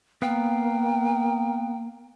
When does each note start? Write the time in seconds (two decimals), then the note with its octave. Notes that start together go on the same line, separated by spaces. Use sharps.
0.22 A#3 B3 B4 F5 G5